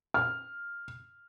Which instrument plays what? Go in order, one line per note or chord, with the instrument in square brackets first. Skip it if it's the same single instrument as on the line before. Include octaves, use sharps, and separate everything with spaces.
[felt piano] F6